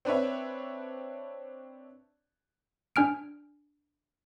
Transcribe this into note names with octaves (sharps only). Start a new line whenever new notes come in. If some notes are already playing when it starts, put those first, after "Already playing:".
C4 D4 B4 C#5 E5
D4 G#5 F6 D7